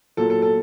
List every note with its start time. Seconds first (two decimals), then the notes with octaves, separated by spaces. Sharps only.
0.17 A#2 F#3 A4
0.30 A4
0.42 A4